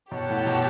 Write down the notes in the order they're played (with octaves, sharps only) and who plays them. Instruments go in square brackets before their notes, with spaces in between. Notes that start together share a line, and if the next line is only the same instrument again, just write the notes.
[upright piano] B2 [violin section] G4 C#5 F#5 A5
[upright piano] A2
B2